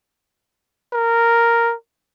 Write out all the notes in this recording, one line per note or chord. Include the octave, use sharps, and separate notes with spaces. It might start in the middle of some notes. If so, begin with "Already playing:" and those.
A#4